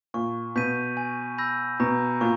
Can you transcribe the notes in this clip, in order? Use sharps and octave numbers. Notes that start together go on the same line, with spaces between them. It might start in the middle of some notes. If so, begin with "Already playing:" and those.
A#2 C#6
B2 G6 B6 D#7
G#5
B5 E6 G6 A#6
B2 A#5
A#2 C#6